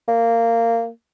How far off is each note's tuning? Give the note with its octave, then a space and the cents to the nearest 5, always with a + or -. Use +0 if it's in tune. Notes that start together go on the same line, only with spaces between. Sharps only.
A#3 -15